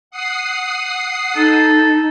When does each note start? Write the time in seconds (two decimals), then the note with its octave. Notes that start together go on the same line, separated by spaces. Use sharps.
0.11 F#5 D#6 C7
1.35 D#4 A4